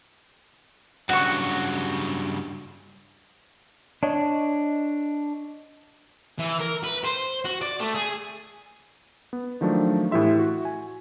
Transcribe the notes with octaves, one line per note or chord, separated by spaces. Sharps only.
G2 C#3 F#3 F#4 C#6
D4 C#5 D#5
E3
A#4
B4
C5
F#4
D5
A3
G#4
B3
D#3 F3 F#3 A3 D4
A2 E3 E4 G4 E5 C6
F#4
G#5